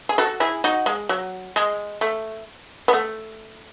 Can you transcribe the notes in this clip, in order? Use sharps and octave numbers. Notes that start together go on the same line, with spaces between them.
G#4
F#4 A4
E4 G#4
D#4 F#4
G#3
F#3
G#3
A3
B3
A3